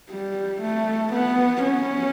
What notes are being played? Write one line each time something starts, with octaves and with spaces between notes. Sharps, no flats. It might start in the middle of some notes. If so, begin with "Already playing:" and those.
G3
A3
B3
C#4